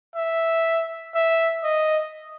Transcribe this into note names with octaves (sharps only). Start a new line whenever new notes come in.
E5
E5
D#5